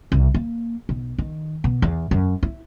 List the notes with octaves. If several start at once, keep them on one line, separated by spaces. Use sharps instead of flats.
C2
A#3
B1
D#3
B2
E2
F#2
E4